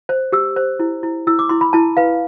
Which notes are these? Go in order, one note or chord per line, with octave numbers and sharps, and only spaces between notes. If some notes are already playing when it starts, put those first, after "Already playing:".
C5
G4 E6
C5
E4
E4
E4 E6
D6
E4 C6
B5
E4 A5
B4 F5